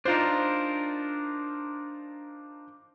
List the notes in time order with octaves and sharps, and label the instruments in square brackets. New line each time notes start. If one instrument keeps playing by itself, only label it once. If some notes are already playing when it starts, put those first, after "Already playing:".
[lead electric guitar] D4 A#4 [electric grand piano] D#4 F4 C5